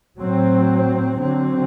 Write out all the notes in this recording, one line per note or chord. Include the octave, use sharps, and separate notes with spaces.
A2 F#3 C4
D3 F#3 C4